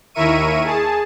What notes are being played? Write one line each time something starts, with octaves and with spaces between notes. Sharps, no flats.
D#2 E4 A#4 E5 C#6 D#7
G#4 A5